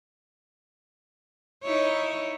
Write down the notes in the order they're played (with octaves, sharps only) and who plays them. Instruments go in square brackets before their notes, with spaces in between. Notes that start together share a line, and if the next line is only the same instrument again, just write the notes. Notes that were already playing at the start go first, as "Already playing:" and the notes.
[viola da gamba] D#4 E4 C#5